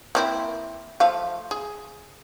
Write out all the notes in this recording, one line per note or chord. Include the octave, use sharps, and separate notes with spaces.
A#3 C4 E4
F3 A3 F5
G#4